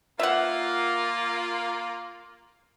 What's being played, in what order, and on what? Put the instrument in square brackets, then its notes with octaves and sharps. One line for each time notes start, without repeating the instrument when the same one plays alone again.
[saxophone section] A#3 F4 [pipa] E5 F#5